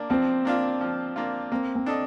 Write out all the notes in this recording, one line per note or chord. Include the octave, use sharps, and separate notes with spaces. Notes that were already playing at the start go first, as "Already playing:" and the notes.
Already playing: A#3 D4
F3 C4
A#3 D4 F4
F3
A#3 D4 F4
A#3 C4
C4
D4 A4 D#5